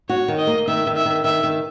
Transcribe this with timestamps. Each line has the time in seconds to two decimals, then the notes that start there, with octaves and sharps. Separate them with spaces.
0.09 F#4 C#5
0.28 D#3
0.38 D#5
0.47 A#3
0.67 D#3 E5
0.87 D#3
0.96 E5
1.05 D#3
1.24 D#3 E5
1.43 D#3